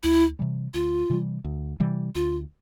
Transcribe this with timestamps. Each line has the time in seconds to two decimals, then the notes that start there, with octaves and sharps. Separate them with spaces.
0.03 D2 E4
0.39 C3 E3 G3
0.74 D2 F4
1.10 C3 E3 G3
1.44 D2
1.80 C3 E3 G3
2.15 D2 F4